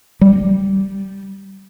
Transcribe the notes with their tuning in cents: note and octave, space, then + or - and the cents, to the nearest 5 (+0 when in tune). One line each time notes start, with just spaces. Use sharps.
G3 -10